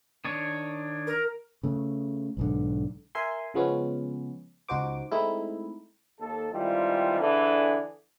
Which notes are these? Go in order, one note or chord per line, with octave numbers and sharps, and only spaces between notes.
D#3 D4 C#5
A#4
C#3 A3
B1 G#2 D3
A#4 E5 G#5 C6
C#3 F3 G#3 B3 C#4
C#2 D#4 F#4 C5 D6
G#3 A3 C4 D#4 E4
D#2 A4
D#3 E3 G3 G#3 C4 F4
D3 E3 D4 G#4 A4